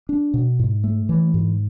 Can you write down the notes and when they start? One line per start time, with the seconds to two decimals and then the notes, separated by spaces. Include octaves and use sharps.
0.09 D4
0.34 B2
0.59 G#2
0.84 A3
1.09 E3
1.34 G#2